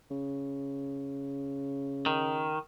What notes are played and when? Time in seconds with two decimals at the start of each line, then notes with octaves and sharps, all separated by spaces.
0.10 C#3
2.06 D#3